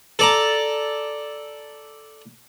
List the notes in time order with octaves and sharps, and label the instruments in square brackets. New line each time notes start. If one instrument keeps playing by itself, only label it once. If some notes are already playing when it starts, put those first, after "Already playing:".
[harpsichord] A4 D5 A#5